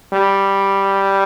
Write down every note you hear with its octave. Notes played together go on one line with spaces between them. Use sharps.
G3